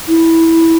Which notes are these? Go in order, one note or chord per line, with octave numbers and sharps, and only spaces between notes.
E4